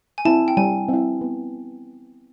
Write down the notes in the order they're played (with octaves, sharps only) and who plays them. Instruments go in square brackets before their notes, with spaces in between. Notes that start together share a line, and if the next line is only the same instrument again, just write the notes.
[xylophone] G#5
[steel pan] C4 E4 [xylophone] A5
[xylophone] G5
[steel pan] G3 [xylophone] G#5
[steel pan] C4 E4
B3